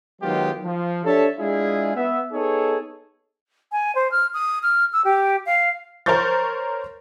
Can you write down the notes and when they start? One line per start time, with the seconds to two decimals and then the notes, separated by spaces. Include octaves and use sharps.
0.22 D#3 F#3 G#3 B3 F4 G4
0.64 F3
1.04 D4 G4 A4 C#5 E5 A5
1.38 G#3 D4 E4 F4 G#4
1.96 B3 E5
2.33 B3 D#4 G#4 A4 C#5
3.72 G#5
3.95 C5
4.11 F6
4.34 D#6
4.63 F6
4.93 E6
5.05 G4
5.46 F5
6.06 A#4 C5 C#5 C#6 G6 A6